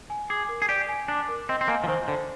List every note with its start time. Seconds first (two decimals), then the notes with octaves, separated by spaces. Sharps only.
0.10 G#5
0.29 G#4 D6
0.49 A#4
0.62 G#4
0.69 G4 D5
0.89 G#5
1.08 D4 D6
1.28 A#4
1.49 C4 D#5
1.61 C4
1.68 A#3 G#5
1.84 F3
1.88 D#3 C5
2.08 D3 C5